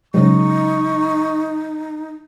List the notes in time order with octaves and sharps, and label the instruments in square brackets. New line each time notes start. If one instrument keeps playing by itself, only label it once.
[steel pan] C#3 F#3 G#3 [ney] D#4 [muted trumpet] C#6